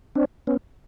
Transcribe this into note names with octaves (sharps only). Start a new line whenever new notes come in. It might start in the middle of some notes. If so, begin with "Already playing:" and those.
C4 D4
B3 C#4